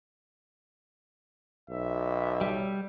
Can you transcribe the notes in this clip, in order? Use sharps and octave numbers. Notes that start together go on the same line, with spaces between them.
B1 E5
G3